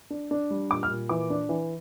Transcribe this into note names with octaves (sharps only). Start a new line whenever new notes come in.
D4
D4
G3
A#2 D6
F6
A#2
E3 D6
D4
E3